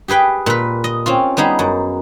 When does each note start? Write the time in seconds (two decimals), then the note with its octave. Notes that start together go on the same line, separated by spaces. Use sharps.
0.08 G4 G#4 B4 G5
0.46 A#2 B4
0.84 D#5
1.06 C4 C#4 F4
1.37 G3 B3 D#4 G#4
1.59 F#2